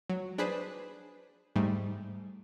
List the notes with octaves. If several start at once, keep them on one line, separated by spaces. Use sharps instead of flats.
F#3
D4 G#4 B4 C5
G#2 G3 A3